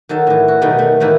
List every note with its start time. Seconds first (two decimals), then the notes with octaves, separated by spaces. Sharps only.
0.09 D#3 F#3 A4 A5
0.27 A2 E3
0.48 F#4
0.61 B2 D#3 F#3 G3 A3
0.79 A3
1.00 A2 D#3 E3 A3 A#3